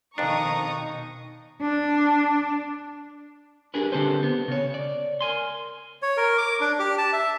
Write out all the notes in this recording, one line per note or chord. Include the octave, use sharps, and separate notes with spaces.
F2 B2 D#3 D4 D#4 A#5 C#6 D#6
D4
D4 G4 G#4 A#4 B4
D3 C4 G4 A4 B4 C5
B3
C#3 C#5
D5
A#4 G#5 C6
C#5
A#4
D6
D4
G4
A5
E5